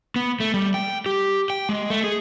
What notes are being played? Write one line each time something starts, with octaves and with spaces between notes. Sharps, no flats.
B3
A3
G3
G5
G4
G5
G#3
A3
G#4